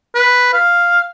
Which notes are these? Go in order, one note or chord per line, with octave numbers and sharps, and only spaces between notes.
B4
F5